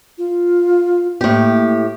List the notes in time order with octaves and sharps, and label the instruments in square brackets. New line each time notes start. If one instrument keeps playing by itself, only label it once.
[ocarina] F4
[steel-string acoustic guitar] A2 G4 [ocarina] A#3